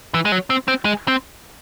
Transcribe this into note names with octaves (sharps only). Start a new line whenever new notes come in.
E3
G#3
F#3
C4
C4
G#3
C4